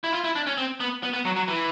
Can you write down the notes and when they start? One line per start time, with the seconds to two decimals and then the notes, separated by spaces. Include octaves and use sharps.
0.04 E4
0.13 F4
0.24 E4
0.35 D4
0.47 C#4
0.58 C4
0.80 B3
1.03 B3
1.14 B3
1.25 F#3
1.36 F#3
1.48 E3